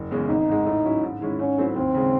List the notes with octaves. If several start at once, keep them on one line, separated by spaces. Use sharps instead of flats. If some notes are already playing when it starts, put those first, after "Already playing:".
Already playing: F#1
E2 C#3 G#3 C#4
G#1 D#4
G#2 D#3 G#3
A2
F#3 C#4 E4
G#2
D#3 G#3 C#4 E4
G#2 C#4
F#3 A3 C4 E4
D#2 C4
C#3 G#3